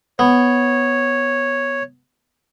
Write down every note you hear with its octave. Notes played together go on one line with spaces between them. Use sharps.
B3 C#5